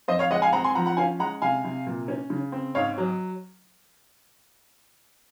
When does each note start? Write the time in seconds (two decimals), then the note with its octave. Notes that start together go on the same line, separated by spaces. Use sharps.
0.08 F2 C5 D#5
0.19 C#5 F5
0.31 G#3 D#5 F#5
0.42 F5 G#5
0.52 C4 F#5 A#5
0.64 G#5 C6
0.75 F3 F#5 A#5
0.86 F#5 A#5
0.97 C#4 F5 G#5
1.19 G#3 F#5 A#5
1.42 C3 F5 G#5
1.64 C3
1.87 A#2
2.08 C#4
2.30 C#3
2.52 C4
2.75 G#2 C#5 F5
2.98 F#3